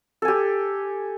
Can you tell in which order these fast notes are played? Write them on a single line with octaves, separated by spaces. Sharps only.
A4 G#5 G4